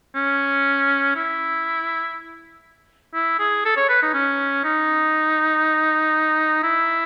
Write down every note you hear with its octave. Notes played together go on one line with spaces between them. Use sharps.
C#4
E4
E4
G#4
A4
C#5
B4
D#4
C#4
D#4
E4